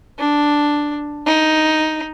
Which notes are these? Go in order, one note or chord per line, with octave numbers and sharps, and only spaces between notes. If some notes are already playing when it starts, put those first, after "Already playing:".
D4
D#4